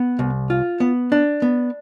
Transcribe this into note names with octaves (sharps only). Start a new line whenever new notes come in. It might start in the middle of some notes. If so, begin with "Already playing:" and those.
Already playing: B3
C2
F4
B3
D4
B3